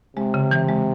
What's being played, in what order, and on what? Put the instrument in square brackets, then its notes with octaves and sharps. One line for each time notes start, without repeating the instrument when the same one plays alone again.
[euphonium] C3 [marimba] G#3
[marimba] C#3
E3
G#3